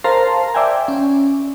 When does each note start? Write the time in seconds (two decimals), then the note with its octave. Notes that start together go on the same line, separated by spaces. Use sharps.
0.04 A#4 C5 F5 A5 A#5 C6
0.54 D5 E5 G5 G#5
0.88 C#4